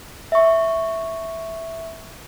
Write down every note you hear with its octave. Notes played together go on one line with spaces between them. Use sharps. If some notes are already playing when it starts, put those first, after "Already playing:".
E5 C#6